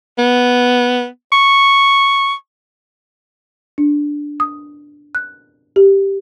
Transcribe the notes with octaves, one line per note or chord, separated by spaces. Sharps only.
B3
C#6
D4
D#6
F#6
G4